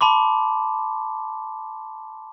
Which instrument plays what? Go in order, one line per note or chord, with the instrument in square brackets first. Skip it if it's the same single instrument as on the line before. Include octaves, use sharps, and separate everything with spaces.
[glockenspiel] A5 B5 C6 D6